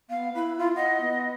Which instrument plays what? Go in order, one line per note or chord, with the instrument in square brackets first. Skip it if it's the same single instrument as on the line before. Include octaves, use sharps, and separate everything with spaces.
[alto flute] B3 [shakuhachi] F5
[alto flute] E4 [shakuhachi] B5
[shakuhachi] F4
[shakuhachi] D#5 [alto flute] F#5
[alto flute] B3